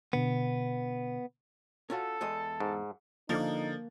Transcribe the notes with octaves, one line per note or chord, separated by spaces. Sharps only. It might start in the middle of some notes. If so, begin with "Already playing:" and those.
B2 D3 B3
C#4 F4 F#4 A4
E2 G#3 D#5
G#2
D3 F3 A#3 D#4